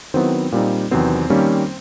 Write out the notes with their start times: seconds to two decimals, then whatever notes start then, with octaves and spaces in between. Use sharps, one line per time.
0.14 D#3 F#3 B3 C4 E4 C5
0.52 A#2 G3 C4 D#4
0.91 E2 C3 D#3 F#3 B3 C4 C5
1.30 D#3 G3 A#3 C#4